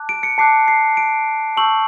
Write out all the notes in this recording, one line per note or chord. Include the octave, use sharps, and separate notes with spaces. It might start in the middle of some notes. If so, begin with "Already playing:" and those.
Already playing: A5 D6 F#6
D7
C#7
A5 D6 F#6 C7
C7
D7
A5 C#6 E6 G6 F#7